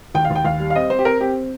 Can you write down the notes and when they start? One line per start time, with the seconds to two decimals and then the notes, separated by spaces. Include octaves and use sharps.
0.15 D#2 G5
0.25 F5
0.30 D#2
0.35 G5
0.45 D#2 F5
0.60 G3
0.70 F5
0.75 C4 D#5
0.90 C4 C5
0.99 G4
1.05 C4 A#4
1.20 C4 G4